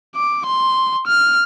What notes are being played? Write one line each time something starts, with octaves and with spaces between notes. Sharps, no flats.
D6
C6
F6